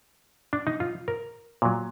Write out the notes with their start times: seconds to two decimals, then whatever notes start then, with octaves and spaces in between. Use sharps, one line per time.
0.53 D4
0.67 D#4
0.80 F4
1.08 A#4
1.62 A#2 F#3